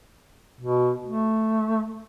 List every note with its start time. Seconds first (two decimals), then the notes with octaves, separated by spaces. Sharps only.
0.60 B2
1.05 A3